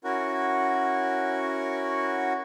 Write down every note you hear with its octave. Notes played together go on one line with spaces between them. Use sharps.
C#4 E4 F#4 A#4 F#5 C#6